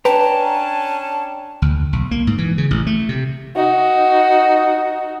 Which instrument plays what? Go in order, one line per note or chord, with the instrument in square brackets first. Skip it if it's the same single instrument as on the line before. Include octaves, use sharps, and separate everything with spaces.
[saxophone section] C#4 D4 [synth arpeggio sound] B4 [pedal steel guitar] G5 A#5 [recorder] A5
[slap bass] D2
B1
A#3
G#2
E3
C#3
A1
A3
C3
[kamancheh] D#4 F#4